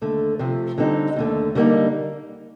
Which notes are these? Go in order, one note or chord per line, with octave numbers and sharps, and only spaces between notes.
D#2 D3 A3
C3 F3 A3
D3 G3 C4 D#4
D#2 D3 A3
D3 G3 A#3 D#4